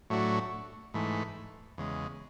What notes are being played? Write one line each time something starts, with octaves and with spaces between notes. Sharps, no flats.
A2 F#3 A3 D4 F#4
G#2 E3 A3
E2 C#3 G#3